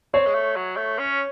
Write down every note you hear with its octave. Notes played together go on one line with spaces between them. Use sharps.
C4 C#5
G#3
A3
F#3
A3
C#4